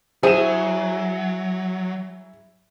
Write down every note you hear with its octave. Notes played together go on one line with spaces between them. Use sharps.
F#3 E4 G#4 C5 E7